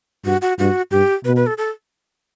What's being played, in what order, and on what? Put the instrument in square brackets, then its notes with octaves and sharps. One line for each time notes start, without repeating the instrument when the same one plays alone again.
[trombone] G2 [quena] F#4
[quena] F#4
[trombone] G2 [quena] F#4
[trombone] G2 [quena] G4
[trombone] B2 [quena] B4
[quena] B4
A4
A4